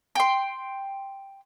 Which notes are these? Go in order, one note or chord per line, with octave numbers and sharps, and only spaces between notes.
G5 C6